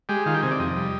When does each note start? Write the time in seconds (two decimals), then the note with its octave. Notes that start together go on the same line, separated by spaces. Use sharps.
0.09 G#3 G4
0.26 D#3 F4
0.34 G4
0.42 C3 G#4
0.51 D5
0.59 F2 D#5
0.76 G3